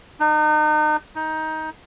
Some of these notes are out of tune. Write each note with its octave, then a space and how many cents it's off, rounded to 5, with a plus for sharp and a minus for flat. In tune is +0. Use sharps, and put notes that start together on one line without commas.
D#4 -35
D#4 +15